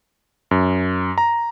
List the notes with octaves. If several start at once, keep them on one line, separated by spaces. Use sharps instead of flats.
F#2
A#5